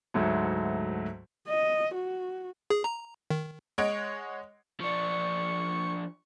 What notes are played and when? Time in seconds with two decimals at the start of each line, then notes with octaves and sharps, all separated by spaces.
0.14 D2 G#2 F#3 A3
1.49 D#5
1.95 F#4
2.70 G#4
2.84 A#5
3.30 D#3
3.78 G#3 C#5 D#5 F#5 G#6 D7
4.80 F3 D4 C#6